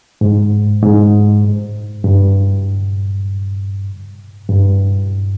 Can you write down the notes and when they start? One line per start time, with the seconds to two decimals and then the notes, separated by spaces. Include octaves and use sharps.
0.21 G#2
0.82 G#2
2.04 G2
4.49 G2